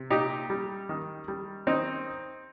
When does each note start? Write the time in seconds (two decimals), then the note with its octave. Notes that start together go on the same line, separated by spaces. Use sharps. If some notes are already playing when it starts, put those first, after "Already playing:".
Already playing: C3
0.10 A#2 D#4 G4
0.50 G3
0.89 D#3
1.28 G3
1.67 D#3 C4 D#4